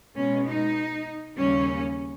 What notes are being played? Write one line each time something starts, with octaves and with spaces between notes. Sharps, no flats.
B2 G#3 C#4
D#4
D#2 C#3 G3 A#3 C#4